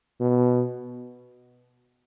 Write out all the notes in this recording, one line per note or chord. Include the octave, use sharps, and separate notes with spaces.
B2